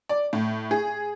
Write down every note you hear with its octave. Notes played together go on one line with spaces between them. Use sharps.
D5
A2
G#4